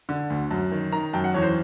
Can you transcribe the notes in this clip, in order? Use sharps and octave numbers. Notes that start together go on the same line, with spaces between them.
D3
D2
F#2
D#3
D#3 A#5
F#2 G5
F#5
E2 C#5
C5